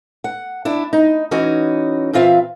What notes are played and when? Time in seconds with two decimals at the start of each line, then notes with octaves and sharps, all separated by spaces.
0.24 F#5
0.65 D4 E4
0.93 D#4
1.31 E3 C#4 D#4 F#4
2.13 A#2 E3 C4 F4 E5 F5